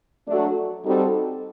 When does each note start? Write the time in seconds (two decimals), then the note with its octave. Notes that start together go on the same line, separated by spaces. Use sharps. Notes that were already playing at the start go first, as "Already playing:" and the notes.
0.27 F#3 A3 D4
0.84 G3 C4 D#4 F#4 A4